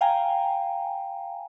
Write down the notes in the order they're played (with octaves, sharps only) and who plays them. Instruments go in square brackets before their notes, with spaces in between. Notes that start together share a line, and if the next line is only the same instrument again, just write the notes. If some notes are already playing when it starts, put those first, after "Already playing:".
[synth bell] F5 G5 G#5 A#5